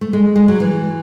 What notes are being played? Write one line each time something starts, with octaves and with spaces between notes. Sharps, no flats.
A3
G#3
G#3
F#3
E3